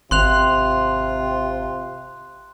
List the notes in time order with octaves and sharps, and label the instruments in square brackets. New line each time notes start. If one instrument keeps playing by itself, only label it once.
[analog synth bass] G#1 [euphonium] C3 [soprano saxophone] F4 [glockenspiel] C6 F#6 F7